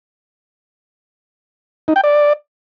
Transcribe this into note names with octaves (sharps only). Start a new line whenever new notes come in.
D#4
G5
D5